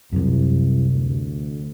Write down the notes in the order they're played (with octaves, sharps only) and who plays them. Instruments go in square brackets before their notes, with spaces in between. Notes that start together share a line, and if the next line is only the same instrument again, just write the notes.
[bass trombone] C2 [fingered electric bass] F#2 C3
[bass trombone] D2